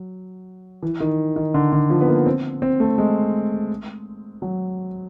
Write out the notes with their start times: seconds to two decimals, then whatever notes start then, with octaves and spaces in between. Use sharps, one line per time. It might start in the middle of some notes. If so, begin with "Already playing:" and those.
Already playing: F#3
0.83 E3
1.00 D#3
1.36 D#3
1.54 D3
1.73 D3
1.90 F3
2.01 B3
2.08 A#3
2.26 C4
2.62 C4
2.80 A3
2.98 G#3
4.42 F#3